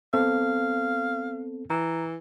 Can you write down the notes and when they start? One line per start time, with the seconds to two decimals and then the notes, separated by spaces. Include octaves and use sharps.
0.14 B3 C4 A4 F5
1.70 E3 A#5